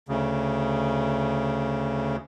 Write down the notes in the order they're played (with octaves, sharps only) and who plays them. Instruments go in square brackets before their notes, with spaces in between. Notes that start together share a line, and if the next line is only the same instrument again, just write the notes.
[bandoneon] D2 C#3